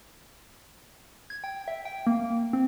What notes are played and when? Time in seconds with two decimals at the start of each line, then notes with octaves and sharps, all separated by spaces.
1.30 G#6
1.44 G5
1.68 E5
1.85 G5
2.07 A#3
2.53 C4